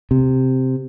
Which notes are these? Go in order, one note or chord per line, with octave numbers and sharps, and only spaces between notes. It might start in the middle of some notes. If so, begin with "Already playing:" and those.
C3